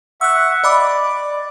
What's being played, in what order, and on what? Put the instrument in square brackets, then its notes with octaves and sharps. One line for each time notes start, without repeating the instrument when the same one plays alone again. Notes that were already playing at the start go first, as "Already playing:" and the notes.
[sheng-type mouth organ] E5 F#5 C#6 [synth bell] E6 F#6
[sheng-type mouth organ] D5 [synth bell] D#5 B5 D6